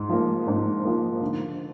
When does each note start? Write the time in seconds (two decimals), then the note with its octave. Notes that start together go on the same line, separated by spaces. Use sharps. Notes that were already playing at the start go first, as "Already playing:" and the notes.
Already playing: G#2
0.09 F3 A#3
0.47 G#2
0.84 F3 A#3
1.21 D3